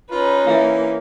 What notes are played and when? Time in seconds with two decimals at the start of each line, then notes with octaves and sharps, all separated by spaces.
0.11 C#4 D#4 F4 B4
0.47 E3 A#3 E5 F5